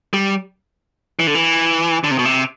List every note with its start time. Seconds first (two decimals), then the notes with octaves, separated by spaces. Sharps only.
0.14 G3
1.19 E3
1.27 D3
1.35 E3
2.04 D3
2.11 C3
2.19 B2
2.25 C3